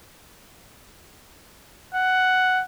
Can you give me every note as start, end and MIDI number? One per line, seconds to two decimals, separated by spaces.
1.94 2.63 78